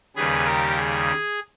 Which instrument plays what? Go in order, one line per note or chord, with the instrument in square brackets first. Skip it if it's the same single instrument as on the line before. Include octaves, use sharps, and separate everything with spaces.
[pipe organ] D#2 C#3 G3 G#4 B4
G4 A#4
G#4